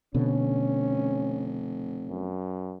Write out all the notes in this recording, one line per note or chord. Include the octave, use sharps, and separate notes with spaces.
F1 B2 D3 C#4
F#2